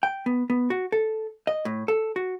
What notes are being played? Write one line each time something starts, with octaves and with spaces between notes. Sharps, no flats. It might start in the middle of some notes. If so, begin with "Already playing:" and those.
G5
B3
B3
F#4
A4
D#5
A2
A4
F#4